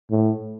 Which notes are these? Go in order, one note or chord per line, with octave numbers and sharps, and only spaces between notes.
A2